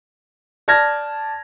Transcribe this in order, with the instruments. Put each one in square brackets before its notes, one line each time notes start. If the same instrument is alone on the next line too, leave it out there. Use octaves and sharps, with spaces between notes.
[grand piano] D5 A5 F6 G#6 A#6